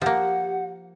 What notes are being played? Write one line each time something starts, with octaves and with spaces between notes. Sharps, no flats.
F3 A#3 G4 F#5